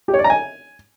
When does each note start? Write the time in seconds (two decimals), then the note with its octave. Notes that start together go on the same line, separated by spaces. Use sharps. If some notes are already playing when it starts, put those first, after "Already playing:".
0.08 G4
0.14 C#5
0.19 D5
0.24 A#5
0.30 G#5